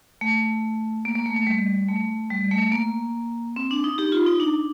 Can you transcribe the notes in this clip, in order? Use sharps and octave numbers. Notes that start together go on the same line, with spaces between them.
A3
A#3
A#3
A3
A3
G3
A3
G3
A3
A#3
C4
D4
D#4
D#4 G4
F4
D#4
D4